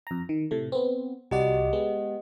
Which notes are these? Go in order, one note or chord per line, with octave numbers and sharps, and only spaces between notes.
F2 A#5
D#3
A2 C3 A3
B3 C4
C2 F#4 G4 D5 D#5 F#5
G#3 B3